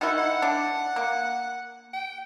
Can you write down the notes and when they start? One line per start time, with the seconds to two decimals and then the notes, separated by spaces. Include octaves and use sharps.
0.01 D#3 D#4 E4 F#5
0.17 F#5
0.42 D4
0.96 A#3
1.93 G5